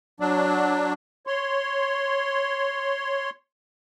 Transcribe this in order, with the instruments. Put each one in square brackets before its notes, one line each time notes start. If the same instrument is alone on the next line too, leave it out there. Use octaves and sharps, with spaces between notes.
[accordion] F#3 D4
C#5 C6